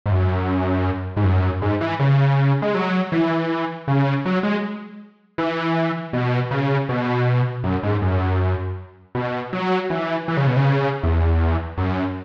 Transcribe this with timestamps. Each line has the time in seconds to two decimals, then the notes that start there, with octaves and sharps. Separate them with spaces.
0.06 G#2
0.11 F#2
1.17 G#2
1.24 F#2
1.62 G#2
1.81 E3
2.00 C#3
2.62 G#3
2.75 F#3
3.12 E3
3.88 C#3
4.25 F#3
4.43 G#3
5.38 E3
6.13 B2
6.51 C#3
6.89 B2
7.64 F#2
7.83 G#2
8.02 F#2
9.15 B2
9.53 F#3
9.90 E3
10.28 E3
10.37 C#3
10.47 B2
10.56 C#3
11.03 E2
11.78 F#2